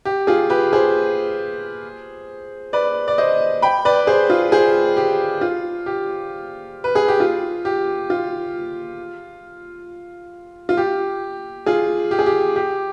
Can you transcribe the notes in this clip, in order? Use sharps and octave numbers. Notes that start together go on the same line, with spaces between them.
G4
F4 G#4
G4 B4
G#4 C5
B4 D5
D5
C5 D#5
G5 B5
B4 D5
G#4 C5
F4 G#4
G#4 C5
G4
F4
G4
B4
G#4
G4
F4
G4
F4
F4
G4
F4 G#4
G4
G#4
G4
G4